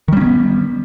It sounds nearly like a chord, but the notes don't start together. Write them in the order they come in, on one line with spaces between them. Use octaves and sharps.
D#3 G3 C#4 B3